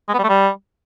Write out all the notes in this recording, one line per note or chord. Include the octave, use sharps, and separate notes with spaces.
G#3
B3
G3
A3
G3